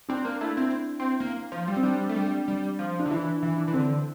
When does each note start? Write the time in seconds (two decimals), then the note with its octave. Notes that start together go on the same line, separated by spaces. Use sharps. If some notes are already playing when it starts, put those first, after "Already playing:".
0.09 C4 D4
0.24 A#3 D4
0.41 A3 E4
0.57 C4 E4
1.00 C4
1.20 A#3
1.52 F3
1.68 G3
1.77 C4
1.83 G3 D4
2.09 A3
2.16 G3
2.48 G3
2.79 F3
3.00 D4
3.06 D3
3.10 E3 E4
3.27 E4
3.43 E3 E4
3.58 D4
3.68 E3
3.74 D3 C4